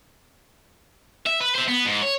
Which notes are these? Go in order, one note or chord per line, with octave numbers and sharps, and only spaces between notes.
E5
B4
C5 E5
B3
G#2
C#5